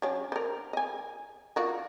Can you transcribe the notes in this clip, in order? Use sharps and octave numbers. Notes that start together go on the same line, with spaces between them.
F#3 C#4 D4
A#4 C5
D#5 G#5
F4 F#4 A#4